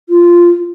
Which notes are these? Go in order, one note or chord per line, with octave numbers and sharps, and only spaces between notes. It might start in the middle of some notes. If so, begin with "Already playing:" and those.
F4